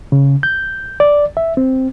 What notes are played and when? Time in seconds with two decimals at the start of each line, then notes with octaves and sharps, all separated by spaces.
0.12 C#3
0.43 G6
1.00 D5
1.37 E5
1.57 C4